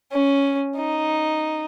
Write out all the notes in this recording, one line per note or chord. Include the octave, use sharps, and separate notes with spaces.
C#4
D#4